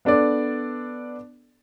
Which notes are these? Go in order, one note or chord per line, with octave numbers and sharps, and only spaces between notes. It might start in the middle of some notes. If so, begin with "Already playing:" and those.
B3 D4 A4 D5